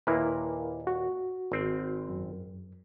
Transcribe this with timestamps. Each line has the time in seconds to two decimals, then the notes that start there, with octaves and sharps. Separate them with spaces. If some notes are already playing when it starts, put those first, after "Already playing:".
0.07 D#2 A#2 A#3 E4 A#4 B4
0.87 F#4
1.52 G#1 C4
2.09 F#2